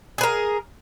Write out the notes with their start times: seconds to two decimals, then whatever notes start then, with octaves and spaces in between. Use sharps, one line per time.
0.18 G#4
0.21 B4
0.23 A#4